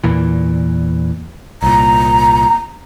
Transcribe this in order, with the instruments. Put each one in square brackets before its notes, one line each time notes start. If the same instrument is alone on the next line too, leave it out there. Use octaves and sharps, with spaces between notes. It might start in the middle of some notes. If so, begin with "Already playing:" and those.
[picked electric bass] E2 A#2 E3
[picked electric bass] C2 A#2 [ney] A#5